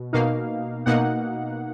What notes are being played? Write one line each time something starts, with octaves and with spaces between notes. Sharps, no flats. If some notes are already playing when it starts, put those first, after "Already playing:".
Already playing: B2
B2 A#3 D#4 F5
B2 A#3 D#4 F#5